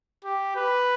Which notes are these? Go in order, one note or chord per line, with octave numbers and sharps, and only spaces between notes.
G4
B4